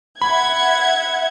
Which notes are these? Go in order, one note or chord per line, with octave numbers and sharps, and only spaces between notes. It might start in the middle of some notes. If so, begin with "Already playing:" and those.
E5 F#5 B5 G#6